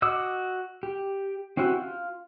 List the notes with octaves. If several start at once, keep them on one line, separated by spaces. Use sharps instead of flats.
F#4 D#5 D6 E6
G4
C4 C#4 E4 F#4 G4
F4